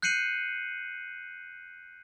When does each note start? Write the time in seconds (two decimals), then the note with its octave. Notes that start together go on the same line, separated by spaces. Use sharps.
0.02 F#6 G6 C7 C#7 D#7 F#7